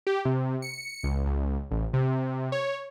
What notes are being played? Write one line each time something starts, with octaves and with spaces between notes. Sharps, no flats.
G4
C3
C#7
C#2
C#2
A1
C3
C#5